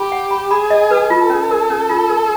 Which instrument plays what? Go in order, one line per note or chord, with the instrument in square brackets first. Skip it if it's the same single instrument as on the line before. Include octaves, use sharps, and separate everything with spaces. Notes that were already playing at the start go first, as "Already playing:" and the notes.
Already playing: [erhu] G4 [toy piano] B5
[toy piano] F#5
B5
[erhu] G#4 [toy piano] B5
[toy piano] D#5
B4
[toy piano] F4 [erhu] A4
[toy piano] C#4
A#4
C#4
F4
A#4